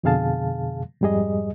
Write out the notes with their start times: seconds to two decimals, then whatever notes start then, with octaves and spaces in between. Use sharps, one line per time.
0.03 F2 B2 D3 G#4 F5 A5
1.01 F2 G#2 G3 G#4 D#5